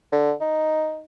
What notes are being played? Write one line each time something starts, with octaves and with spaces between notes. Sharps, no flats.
D3
D#4